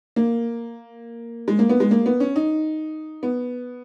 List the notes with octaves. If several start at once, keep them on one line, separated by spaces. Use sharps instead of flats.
A#3
G#3
A#3
B3
G#3
A#3
B3
C#4
D#4
B3